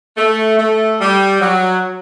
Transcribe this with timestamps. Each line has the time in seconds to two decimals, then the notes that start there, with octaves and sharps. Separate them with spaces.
0.17 A3
0.58 A3
1.00 G3
1.40 F#3